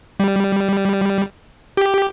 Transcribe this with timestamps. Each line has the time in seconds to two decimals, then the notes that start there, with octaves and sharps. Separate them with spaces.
0.20 G3
1.77 G4